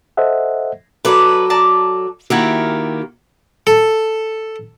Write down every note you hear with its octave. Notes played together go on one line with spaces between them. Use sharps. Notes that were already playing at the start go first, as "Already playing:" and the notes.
A4 C5 D#5 E5 F#5
F#3 A4 B4 D5 B5
D5 A5 A#5
D#3 A#3 E4 F#4 G4 E5
A4